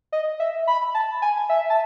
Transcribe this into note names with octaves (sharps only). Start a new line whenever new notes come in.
D#5
E5
B5
A5
G#5
E5
A5